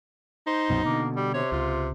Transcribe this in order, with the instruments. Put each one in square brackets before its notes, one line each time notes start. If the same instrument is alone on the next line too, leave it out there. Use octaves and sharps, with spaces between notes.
[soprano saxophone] D#4 [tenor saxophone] C5
[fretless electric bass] C2 F#2 B2
[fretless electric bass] B2 D3 [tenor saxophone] A#3
[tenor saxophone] G3
[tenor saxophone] C3 [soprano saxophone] C#5
[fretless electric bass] C#2 [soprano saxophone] F4